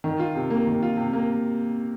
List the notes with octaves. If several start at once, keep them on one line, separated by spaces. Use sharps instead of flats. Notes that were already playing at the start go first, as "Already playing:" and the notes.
D#3
F4
C3
A#3
D#3
F4
C3
A#3